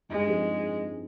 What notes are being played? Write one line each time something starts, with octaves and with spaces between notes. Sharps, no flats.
G2 G#3
F3 C4 D#4 G#4